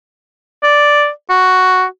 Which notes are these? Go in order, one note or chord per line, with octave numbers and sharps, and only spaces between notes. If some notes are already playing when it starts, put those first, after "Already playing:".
D5
F#4